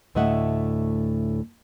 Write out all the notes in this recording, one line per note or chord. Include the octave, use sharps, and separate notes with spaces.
D2 A2 A3 D#5 E5 F#5